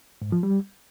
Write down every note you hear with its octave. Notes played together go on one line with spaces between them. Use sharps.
G#2
F3
G3